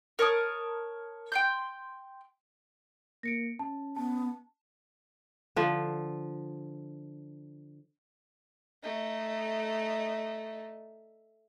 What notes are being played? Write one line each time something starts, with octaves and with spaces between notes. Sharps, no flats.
A#4 C#5 A5 D#6
G5 C6 G6
A#3 A#6 C#7 D7
C#4 A5
B3 A5
D3 F3
A3 D#4